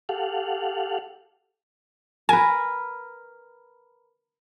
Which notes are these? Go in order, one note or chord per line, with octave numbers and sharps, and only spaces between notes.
G4 A4 F5 F#5
A#4 B4 G#5